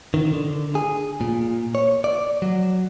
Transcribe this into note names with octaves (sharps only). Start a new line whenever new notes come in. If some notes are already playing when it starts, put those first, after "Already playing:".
D#3
D3
G#4
A#2
C#5
D5
F#3